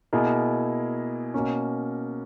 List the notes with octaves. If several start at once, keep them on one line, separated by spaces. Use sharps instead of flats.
B2 A#3 E4 G#4
B2 A#3 C#4